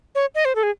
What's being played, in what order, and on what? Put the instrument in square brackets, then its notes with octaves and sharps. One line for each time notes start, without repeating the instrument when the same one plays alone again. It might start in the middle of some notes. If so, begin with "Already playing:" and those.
[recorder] C#5
D#5
C5
A4
G#4